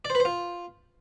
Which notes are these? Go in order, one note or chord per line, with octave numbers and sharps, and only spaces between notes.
D5
C5
B4
C5
F4